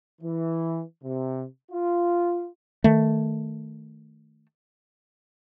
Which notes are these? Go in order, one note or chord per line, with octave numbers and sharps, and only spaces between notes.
E3
C3
F4
D#3 A3